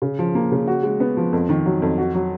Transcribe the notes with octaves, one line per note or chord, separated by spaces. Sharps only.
C#3
F3
A#3
C#3
F#4
G#3
B3
F3
F2
D#3
F#3
F2
F#4
F#3